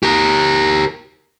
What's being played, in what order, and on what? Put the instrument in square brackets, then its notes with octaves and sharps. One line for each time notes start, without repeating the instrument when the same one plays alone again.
[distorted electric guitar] G4 A#4